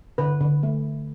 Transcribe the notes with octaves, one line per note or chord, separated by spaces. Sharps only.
D3 B4
D3
A3